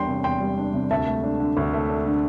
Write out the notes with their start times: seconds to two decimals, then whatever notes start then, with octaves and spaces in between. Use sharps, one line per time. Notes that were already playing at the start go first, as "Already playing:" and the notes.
Already playing: E2 G3 D4 G5 C6
0.08 C3
0.24 E2 G5 C6
0.40 G3
0.58 D4
0.74 C3
0.91 D2 E5 A5
1.07 A3
1.24 D4
1.40 D3
1.57 D2
1.73 A3
1.90 D4
2.06 D3